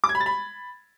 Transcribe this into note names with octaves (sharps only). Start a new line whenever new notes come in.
D6
G#6
B5
A6
B5